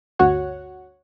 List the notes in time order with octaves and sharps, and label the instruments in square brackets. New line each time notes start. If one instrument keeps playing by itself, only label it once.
[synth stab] G1 D2 F#4 C#5 F#5